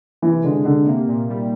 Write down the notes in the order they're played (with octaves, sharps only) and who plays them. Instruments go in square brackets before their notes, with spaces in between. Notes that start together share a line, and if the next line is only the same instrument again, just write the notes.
[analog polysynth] C3 [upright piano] E3
[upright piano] D3 [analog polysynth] G#3
[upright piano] D3 [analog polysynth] D#3
[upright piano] C3 [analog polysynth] A#3
[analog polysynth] A#2
G3